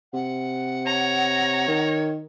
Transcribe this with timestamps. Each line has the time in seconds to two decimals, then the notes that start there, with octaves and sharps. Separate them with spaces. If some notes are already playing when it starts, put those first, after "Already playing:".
0.13 C3 F#5
0.86 C#5 A#5
1.68 D#3